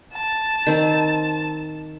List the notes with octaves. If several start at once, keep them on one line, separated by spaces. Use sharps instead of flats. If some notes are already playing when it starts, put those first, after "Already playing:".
A5
D#3 C4